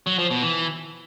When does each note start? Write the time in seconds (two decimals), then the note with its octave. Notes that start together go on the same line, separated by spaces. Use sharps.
0.07 F#3
0.19 F3
0.31 B2
0.43 E3